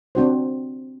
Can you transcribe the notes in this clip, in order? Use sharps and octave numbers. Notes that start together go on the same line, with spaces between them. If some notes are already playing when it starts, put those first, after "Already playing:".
C4 D4 F#4 C5